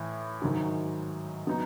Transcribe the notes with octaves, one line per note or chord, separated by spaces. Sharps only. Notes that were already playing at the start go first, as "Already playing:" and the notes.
Already playing: A2 E3
G#2 D#3 F#3
F#3 B3 D#4